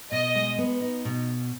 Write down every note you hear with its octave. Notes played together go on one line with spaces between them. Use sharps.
B2 D#5
G#3
B3
D#4
B2